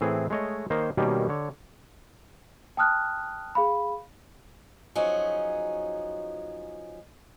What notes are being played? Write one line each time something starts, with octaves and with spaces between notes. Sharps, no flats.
A2 E3 C4 G#4
G#3 A3 C#5 D#5
D#3 A#3 C5 C#5 D#5
B2 D#3 G3 A#3 C#4
D3 C#5
G5 A5 D#6 F6 F#6
G#4 F5 B5
F3 F#3 C#4 D#4 G#4